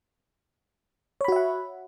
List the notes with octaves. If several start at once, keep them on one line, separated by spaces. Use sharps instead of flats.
F#4 C#5 E5 F#5 B5